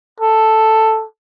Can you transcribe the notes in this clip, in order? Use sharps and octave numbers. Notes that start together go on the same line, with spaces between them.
A4